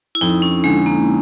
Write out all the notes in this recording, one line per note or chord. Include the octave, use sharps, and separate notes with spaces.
E4
F2 D#4
C#4
D3 G#3
A#3